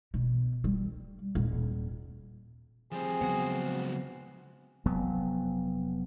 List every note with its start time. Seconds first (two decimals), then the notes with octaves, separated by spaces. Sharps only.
0.14 B2
0.64 G3
1.35 D#1
2.92 F3 G3 C4 G#4
3.21 C#2 F3 F#3 B3 F#4
4.86 F1 F#3 B3